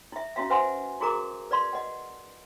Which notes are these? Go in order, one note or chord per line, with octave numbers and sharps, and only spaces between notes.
E4 E5
C#4 E4 F#4 E5 F5
B4 C5 E5 F#5 G#5 C6
E4 F#4 G#4 A#4 A#5 D6
B4 D5 F5 C6
D#5 F#5